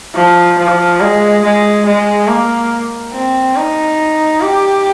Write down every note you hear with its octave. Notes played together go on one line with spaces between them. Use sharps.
F3
F3
G#3
G#3
G#3
A#3
C4
D#4
G4